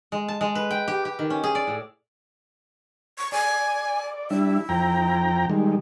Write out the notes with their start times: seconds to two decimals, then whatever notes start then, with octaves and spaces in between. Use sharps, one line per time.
0.12 G#3
0.28 A5
0.41 G#3
0.55 B4
0.71 G5
0.88 G4
1.05 G4
1.19 D#3
1.30 C#4
1.44 G#4
1.55 D5
1.67 A2
3.18 C#6
3.32 D5 G#5
4.30 G3 D4 E4 E5
4.69 F2 G5 A#5
5.50 D#3 G3 G#3